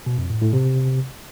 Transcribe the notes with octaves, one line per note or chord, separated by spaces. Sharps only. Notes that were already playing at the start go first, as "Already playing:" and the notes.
B2
F2
A2
A2
C3